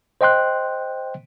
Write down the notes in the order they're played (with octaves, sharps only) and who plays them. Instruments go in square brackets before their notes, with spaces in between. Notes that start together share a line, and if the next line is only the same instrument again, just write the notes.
[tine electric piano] C5 D#5 G5 C6 F#6